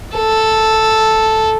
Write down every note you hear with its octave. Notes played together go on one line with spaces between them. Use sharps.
A4